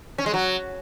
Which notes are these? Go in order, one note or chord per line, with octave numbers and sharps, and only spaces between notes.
C#4
G#3
F#3